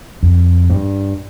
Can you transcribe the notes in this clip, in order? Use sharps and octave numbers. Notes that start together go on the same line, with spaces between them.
F2
G2